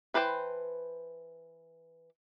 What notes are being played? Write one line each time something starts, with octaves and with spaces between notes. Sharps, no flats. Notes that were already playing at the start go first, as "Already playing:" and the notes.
E3 B4 C5 G5 A5